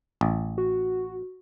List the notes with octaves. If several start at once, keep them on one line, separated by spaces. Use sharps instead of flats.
A1
F#4